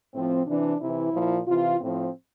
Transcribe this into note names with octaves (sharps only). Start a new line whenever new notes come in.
A2 F3 C4
C3 E3 D4
C3 E3 E4
A#2 F3
C3 E3 F4
A2 F3 C4